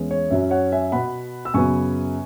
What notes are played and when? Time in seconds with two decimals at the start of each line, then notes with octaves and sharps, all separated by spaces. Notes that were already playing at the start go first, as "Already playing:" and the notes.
Already playing: E2 E3 G#3 C#4
0.11 C#5
0.31 F#2 F#3 C#4 E5
0.51 C#5 F#5
0.72 E5 G#5
0.92 B2 B3 F#5 B5
1.45 E6
1.54 F#2 C#3 F#3 B3 G#5 C#6